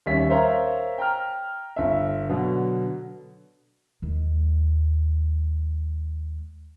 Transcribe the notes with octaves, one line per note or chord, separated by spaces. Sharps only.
D#2 G3 C#4 E5 B6
A#4 C5 C#5 E5 F5 A#5
G5 A#5 F6
G1 E5
B2 D3 F#3
D#2 G#3